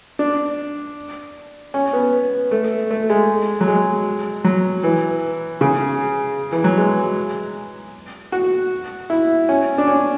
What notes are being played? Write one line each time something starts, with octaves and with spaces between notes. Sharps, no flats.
D4
C#4
B3
A3
A3
G#3
F#3
G#3
F#3
E3
C#3
E3
F#3
G#3
F#4
E4
C#4
D4
C#4